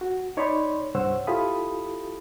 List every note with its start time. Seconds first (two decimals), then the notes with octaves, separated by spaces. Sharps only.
0.01 F#4
0.37 D#4 C#5 D5 B5 C6
0.94 C2 G2 C5 C#5 F#5 E6
1.27 E4 F4 G4 A4 B5 D#6